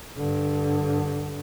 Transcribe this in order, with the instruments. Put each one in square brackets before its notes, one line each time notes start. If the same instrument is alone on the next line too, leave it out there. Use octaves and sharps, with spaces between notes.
[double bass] G2 D3